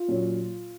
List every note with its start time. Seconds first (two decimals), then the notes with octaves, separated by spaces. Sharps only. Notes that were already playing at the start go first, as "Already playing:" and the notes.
Already playing: F4
0.08 A#2 F#3 C#4